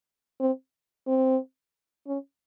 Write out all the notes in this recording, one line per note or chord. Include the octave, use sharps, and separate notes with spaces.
C4
C4
C#4